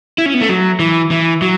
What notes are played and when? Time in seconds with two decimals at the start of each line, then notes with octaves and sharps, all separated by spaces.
0.18 E4
0.26 C#4
0.34 B3
0.41 A3
0.49 F#3
0.79 E3
1.11 E3
1.42 F#3